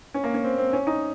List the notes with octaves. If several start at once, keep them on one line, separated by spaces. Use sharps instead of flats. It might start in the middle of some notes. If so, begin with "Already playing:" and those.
C#4
A#3
C#4
C4
C4
C#4
D#4